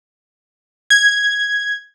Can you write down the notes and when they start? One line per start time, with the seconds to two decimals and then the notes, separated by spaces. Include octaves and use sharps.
0.90 G#6